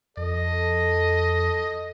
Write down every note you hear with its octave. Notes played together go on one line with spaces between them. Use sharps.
F2 A4 D#5